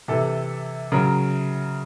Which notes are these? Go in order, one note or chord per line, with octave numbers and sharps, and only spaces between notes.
C3 E3 A4
C#3 F#3 A#4